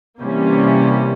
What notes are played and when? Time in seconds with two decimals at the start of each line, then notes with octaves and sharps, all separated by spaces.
0.21 C3 E3 G3 A#3 C#4